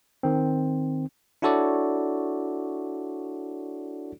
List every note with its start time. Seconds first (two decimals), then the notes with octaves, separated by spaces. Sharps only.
0.23 D#3 C4
1.42 D4 E4 F#4 A4 C#5 D5